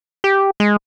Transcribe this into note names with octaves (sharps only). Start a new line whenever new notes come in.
G4
G#3